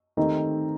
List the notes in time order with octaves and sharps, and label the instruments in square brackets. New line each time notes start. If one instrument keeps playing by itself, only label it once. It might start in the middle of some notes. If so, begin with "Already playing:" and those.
[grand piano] D#3 A3 C4 G4 A#4 [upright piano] D#4